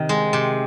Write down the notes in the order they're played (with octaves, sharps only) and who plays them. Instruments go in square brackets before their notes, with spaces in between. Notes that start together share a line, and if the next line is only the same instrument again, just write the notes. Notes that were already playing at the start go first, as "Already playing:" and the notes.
Already playing: [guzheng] C3 D#3
G#3
C3